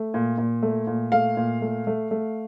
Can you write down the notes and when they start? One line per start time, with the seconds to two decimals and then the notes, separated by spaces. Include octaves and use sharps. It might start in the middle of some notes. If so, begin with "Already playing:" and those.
Already playing: A3
0.14 A#2
0.38 A#2
0.63 A3
0.87 A#2
1.12 A3 F5
1.37 A#2
1.62 A3
1.87 A3
2.11 A3